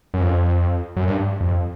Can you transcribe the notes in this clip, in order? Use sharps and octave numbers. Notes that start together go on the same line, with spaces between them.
F#2
F2
F#2
G2
F2